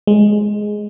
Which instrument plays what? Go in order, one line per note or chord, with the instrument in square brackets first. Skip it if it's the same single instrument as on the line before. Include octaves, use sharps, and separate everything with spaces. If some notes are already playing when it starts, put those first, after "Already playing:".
[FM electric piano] G#3